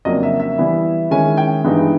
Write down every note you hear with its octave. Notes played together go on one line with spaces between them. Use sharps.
F2 C#3 F#3 A#3 D4 D#5
E5
E5
E3 G3 B3 E4
D#3 G#3 C#4 E4 G#5
G5
G2 E3 G#3 B3 D#4